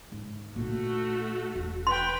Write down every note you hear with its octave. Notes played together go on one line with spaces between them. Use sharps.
G#2
A#2 A3 D#4 F#4
E1
B4 G5 C6